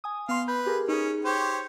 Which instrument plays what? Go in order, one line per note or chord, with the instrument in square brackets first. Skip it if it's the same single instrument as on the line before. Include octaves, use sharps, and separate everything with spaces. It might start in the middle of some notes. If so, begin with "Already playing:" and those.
[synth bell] G#5 D#6
[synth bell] B3 C6 [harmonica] F5
[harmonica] B4 [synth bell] G6
[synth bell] G4 G#4 A#4
[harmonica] C#4 [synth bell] D#4 G#4
[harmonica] G4 C5 C#5